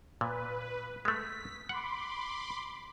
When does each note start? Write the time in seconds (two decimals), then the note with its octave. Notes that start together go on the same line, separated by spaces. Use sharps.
0.21 A#2 B4
1.05 G#3 A3 B6
1.69 F#5 B5 C6 D6